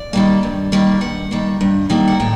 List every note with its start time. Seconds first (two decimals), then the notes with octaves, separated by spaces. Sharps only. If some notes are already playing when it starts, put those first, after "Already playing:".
Already playing: D5
0.13 D#3 G3 A#3
0.43 G2
0.72 D#3 G3 A#3
1.01 G2 F#5
1.31 D#3 G3 A#3
1.61 G2
1.90 D#3 G3 A#3
2.08 F#5
2.20 A2 G5